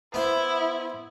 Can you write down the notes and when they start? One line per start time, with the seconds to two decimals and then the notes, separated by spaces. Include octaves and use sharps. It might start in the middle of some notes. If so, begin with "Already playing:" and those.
0.14 B3 E4 C5